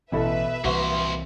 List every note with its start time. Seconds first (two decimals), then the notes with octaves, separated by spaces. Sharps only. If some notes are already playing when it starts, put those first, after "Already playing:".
0.12 A1 B2 E3 E4 A4 B4 E5
0.64 C2 C3 E3 A#3 F#4 C5